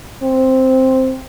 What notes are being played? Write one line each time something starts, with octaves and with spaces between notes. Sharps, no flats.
C4